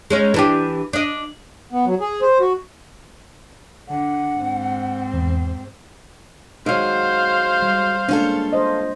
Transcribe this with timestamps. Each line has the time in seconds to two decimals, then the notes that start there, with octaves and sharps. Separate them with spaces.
0.10 G#3 C#4 D#4
0.34 E3 D4 G4
0.93 D4 D#5
1.73 B3
1.86 F#3
2.00 G#4
2.22 C5
2.40 F#4
3.88 D3 F#5
4.37 G#2 C4
5.13 E2
6.66 F#3 G#3 D#4 C5 F5
7.62 G3
8.08 G#3 A#3 C#4 D4 F4 A4
8.53 C5 D#5